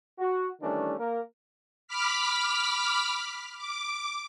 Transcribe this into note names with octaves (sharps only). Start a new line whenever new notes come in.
F#4
D#3 E3 G3 A3 C#4 D4
A#3 A#4
B5 D6 F6 B6
D6